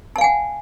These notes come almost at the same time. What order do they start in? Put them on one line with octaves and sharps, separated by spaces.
A5 F5 G#5 F#5